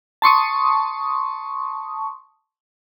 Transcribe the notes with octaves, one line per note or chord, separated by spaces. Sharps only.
A5 C6 C#6 D#6